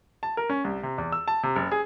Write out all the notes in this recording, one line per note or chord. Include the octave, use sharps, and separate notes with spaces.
A5
A#4
C#4
C2
C3
E2
E6
A5
C3
F#1
G#4